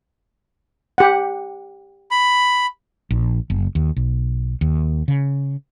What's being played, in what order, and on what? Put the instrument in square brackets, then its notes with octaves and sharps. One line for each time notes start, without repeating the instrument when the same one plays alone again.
[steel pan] G4 F#5
[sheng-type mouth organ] B5
[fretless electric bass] A#1
F#1
D#2
B1
D#2
C#3